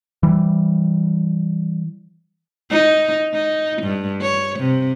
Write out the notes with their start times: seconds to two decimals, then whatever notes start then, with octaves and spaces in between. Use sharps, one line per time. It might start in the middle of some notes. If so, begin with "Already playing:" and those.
0.23 E3 G3
2.70 D#4
3.33 D#4
3.82 G2
4.22 C#5
4.59 C3